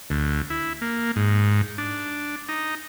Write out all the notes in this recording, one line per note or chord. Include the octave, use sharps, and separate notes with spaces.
D2
E4
A#3
G#2
D4
D#4